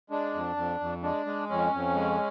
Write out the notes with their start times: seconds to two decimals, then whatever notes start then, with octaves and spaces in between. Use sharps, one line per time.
0.10 G#3 D4
0.34 F2
0.56 F2
0.80 F2
1.03 G#3 D4
1.26 G#3
1.49 F2 C#4
1.73 F2
1.95 G#3